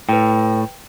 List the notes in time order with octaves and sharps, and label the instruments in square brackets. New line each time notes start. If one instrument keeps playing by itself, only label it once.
[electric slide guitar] A2 [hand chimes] B4 G5